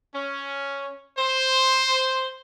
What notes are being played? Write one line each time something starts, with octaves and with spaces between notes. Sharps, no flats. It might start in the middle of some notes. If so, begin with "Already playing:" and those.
C#4
C5